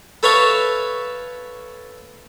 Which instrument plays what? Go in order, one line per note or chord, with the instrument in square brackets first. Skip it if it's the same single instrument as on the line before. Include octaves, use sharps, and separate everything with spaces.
[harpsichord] A4 B4 C#5 E5 F5 A5